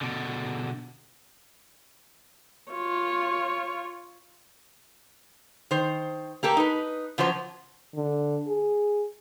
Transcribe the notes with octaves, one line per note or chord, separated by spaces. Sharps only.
B2 D3
F4 C#5
D#3 C5
A#3 G4 A4 A#4
D#4 B4
C#3 F3 F#3 C5
D3
G#4